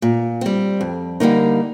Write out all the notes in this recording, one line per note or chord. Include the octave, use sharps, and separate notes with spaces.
A#2
G3 C4
F2
D3 G3 A#3 D#4